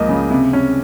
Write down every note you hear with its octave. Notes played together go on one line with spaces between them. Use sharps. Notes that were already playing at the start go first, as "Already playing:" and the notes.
Already playing: C#2 F3 A#3 D#5
C#3
C3
C#4